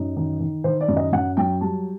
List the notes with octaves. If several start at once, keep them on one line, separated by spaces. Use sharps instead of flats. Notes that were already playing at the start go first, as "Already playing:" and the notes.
Already playing: F#2 D#4
D#3
D#3
D#3 C5
D5
F#2
D#5
F#2 F#5
F#3 G5
G3 A5